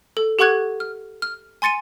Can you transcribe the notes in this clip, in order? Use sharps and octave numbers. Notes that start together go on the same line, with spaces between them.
A4
G4 A4 F#5 C#6 F#6 G#6
F6
F6
G#5 C6 A6 C#7 D#7